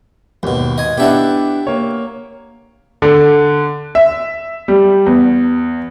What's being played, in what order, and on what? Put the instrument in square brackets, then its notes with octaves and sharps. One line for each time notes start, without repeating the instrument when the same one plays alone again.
[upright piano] G#1 [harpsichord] D#2 B2
[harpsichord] D#5 G#5
[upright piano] B3 D4 E4 [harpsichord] G4 E5 F#5
[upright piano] A#3 C#5
[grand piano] D3
E5
G3
E2